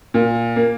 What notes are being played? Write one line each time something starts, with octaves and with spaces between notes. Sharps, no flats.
A#2
A#3